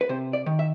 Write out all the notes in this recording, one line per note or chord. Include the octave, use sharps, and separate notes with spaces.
B4
C3 C5
D5
D#3
E5